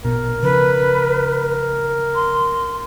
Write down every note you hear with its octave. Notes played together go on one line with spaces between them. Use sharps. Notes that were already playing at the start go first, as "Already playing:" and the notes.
A#1 B2 A#4
C#3 F3 B4
C6